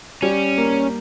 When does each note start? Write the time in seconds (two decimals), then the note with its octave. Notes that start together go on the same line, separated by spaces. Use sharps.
0.22 G3 C#4
0.58 A#3